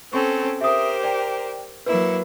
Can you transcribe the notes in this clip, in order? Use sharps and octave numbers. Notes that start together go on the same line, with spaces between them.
C4 C#4 A4 C#6
G4 A#4 C5 E5 D#6
D5 G5
F#3 A#3 E4 B4